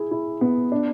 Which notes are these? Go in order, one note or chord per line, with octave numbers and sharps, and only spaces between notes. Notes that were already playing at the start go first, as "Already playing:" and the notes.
Already playing: E4 G#4
E4
B3
D4